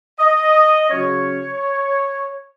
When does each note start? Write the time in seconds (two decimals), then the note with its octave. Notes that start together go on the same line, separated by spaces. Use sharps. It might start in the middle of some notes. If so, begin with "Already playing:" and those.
0.19 D#5
0.90 C#3 F#3 C#4 C#5